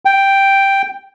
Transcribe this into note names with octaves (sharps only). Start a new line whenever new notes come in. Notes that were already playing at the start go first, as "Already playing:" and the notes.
G5